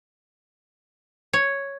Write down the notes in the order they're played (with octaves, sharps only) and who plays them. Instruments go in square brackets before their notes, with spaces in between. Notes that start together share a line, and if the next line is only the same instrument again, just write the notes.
[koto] C#5